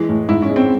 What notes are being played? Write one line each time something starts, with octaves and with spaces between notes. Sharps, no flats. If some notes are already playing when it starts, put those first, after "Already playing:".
Already playing: E3 G#3
A2
G#2 E4
C#4
G#3
C4